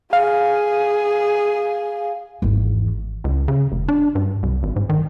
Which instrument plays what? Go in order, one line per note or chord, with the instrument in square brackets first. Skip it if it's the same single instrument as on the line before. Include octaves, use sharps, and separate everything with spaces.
[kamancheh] G#4 [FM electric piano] F5
[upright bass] G#1 E2
[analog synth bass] C#2
C#3
F1
D4
G2
C2
G#1
G#2
D#3